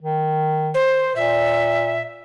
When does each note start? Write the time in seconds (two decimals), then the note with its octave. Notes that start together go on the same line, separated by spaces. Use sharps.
0.01 D#3
0.74 C5
1.16 A#2 E5